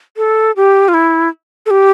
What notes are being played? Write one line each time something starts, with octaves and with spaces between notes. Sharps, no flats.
A4
G4
F4
E4
A4
G4